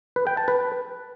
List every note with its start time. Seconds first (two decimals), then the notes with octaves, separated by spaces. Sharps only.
0.16 B4
0.27 G5
0.37 A5
0.48 B4